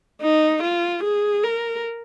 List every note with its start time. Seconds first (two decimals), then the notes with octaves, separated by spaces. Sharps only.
0.22 D#4
0.63 F4
1.04 G#4
1.44 A#4